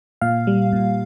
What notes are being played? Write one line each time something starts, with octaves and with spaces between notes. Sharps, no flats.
A#2 F5
G3
A#2